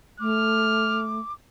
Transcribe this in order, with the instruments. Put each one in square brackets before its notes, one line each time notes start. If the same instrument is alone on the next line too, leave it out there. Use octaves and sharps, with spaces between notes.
[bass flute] A3 [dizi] D6 [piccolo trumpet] F6